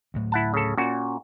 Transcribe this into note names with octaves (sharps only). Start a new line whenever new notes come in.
D2 A2 F#3
E4 F#5 A5
C#3 A4
A#2 C#4 F#4